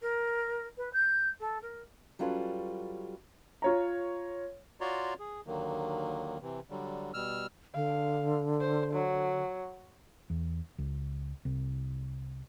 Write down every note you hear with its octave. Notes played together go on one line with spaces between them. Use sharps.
A#4
B4
G6
A4
A#4
F#3 G3 C#4 F4 A4 B4
F4 C#5 A#5
F4 F#4 C#5 D5 A#5 C6
G#4
D#2 D3 D#3 F#3 A#3
C3 E3
D3 F#3 G3
B2 G3 E6 F6
D3 F5
C5
F#3
E2
C#2
C2